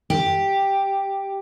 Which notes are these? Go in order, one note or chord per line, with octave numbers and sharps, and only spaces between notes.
G4